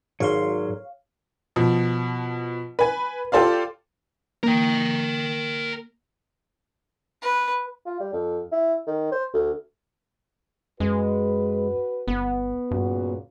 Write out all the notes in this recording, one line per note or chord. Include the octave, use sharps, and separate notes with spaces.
G#1 G#2 F#3 C#5 F5 C6
B2 F3
B4 G#5
F4 G4 A4 C5 D5 F5
A#3 A#4 G5
B4
F4
G3
F2
E4
D#3
C5
D2
F#2 G#3 F#4 B4
G1 B3
G2 A#2 C#3 F#4